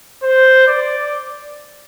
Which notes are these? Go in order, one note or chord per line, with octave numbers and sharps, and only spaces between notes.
C5
D5